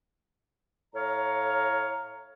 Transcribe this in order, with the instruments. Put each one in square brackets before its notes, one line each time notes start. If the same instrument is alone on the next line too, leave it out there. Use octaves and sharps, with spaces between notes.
[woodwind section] A2 C#5 F5 A#5